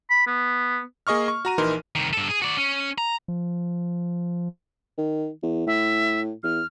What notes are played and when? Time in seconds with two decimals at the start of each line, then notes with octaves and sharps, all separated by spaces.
0.10 B5
0.27 B3
1.07 A#3 G#4 D#5 C#6 F6
1.28 C#6
1.45 F#4 A#5 D#7
1.58 A#1 E3 D#4 A#4 C6
1.95 C2 D#3
2.13 G2 A4
2.29 G#4
2.42 F#4 D5
2.57 C#4
2.98 A#5
3.28 F3
4.98 D#3
5.43 E2
5.67 A2 E5
6.43 E2 F6